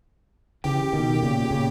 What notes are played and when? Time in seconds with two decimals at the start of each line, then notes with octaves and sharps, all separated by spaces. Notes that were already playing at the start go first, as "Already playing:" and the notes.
0.64 C#3 E3 G4
0.93 B2 D#3
1.22 A#2 C#3
1.51 A#2 C#3